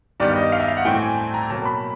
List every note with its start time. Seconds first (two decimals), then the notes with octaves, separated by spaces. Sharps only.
0.20 G2 D#3 G3 B3 D5
0.36 D#5
0.52 F5
0.60 E5
0.68 F5
0.77 F#5
0.85 A2 E3 A3 C4 G5
1.00 G#5
1.17 A5
1.34 A#5
1.50 B2 F#3 A#3 A5
1.65 B5